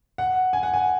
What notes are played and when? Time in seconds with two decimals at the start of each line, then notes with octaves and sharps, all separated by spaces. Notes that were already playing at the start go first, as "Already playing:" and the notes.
0.18 F#5
0.53 G#5
0.63 F#5
0.74 G#5